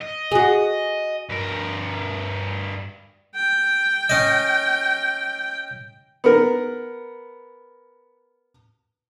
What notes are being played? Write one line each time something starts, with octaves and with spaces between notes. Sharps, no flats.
D#5
F#4 G#4
G2 A#4
G5
C#4 D#5
B3 A#4